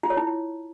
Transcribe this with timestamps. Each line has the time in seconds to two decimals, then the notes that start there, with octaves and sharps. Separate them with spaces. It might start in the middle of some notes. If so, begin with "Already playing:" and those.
0.03 F4
0.10 C#5
0.17 E4